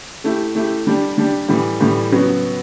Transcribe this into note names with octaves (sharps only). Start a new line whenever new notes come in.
A3 E4 G4
A3 E4 G4
G3 D4 G4
G3 D4 G4
A2 E3 G3
A2 E3 G3
C#3 F#3 B3 F#4